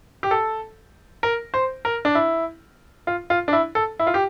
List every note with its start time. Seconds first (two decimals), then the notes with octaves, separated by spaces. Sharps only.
0.23 G4
0.31 A4
1.23 A#4
1.54 C5
1.85 A#4
2.05 D4
2.15 E4
3.07 F4
3.30 F4
3.48 D4
3.53 E4
3.75 A4
3.99 E4
4.07 F4
4.14 G4